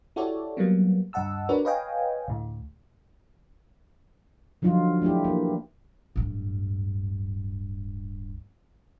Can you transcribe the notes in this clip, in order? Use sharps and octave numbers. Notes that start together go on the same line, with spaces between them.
E4 F#4 G4 A4 C#5 D5
F#3 G3 A#3 B3
D2 G2 D#5 F#5 A5 E6
D4 F#4 A#4 B4 C#5 D5
B4 C#5 D#5 F5 G5 G#5
D2 A2
D3 F3 F#3 D#4 F4
A3 D4 E4 G4
E3 A#3
D1 G2